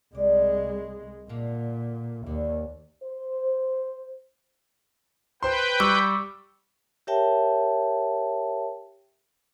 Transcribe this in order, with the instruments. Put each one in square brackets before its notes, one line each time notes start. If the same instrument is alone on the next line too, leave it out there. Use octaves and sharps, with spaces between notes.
[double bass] C2 G#3 [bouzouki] D5
[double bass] A#2 [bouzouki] D3 A#3
[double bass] D#2 [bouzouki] D3
[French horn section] C5
[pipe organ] B4 G5 [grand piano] C5 C6
[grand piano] G3 [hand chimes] C#6 D6 E6
[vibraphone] G4 A#4 C#5 E5 G5 A5